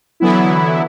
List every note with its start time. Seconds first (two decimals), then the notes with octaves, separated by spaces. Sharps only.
0.20 D3 E3 F#3 B3 E4